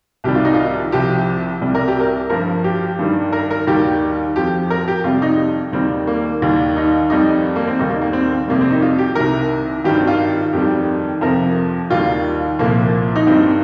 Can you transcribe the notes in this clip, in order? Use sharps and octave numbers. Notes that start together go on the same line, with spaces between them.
C2 C3 D#3 G3 G4
F4
D#4
F4
C2 C3 F3 G4
C2 C3 G3
A#4
G4
A#4
G2 F3 A#4
G4
G2 D#3 G3
A#4
A#4
D#2 D#3 G3 G4
F2 F3 G4
A#4
G4
F2 C3 G3 F4
D#4
D#2 D#3 G3 C4
A#3
D#2 D#3 G3
D#4
F2 D#3 G3 D#4
A#3
C4
D#2 D#3 G3 D#4
A#3
A#3
C4
F2 C3 G3 A#3
C4
D#4
F4
G4
C2 C3 D#3 A#4
G2 D#3 G3 G4
C4
F4
F2 D#3 G3 G4
F2 C3 F3 A#4
D#2 D#3 G3 F4
C2 A#2 F3 A#3
D#4
G2 D#3 G3 C4